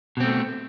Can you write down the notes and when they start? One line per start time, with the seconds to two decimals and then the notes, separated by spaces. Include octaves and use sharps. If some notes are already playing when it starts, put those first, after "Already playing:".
0.17 B2
0.20 C4
0.24 A3